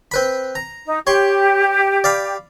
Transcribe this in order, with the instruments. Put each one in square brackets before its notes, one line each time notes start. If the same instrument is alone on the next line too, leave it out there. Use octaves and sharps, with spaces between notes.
[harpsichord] C4 B4 B5
A#5
[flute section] D#4
[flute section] G4 [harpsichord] C#5 C6 C#6
[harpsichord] D5 F5 B5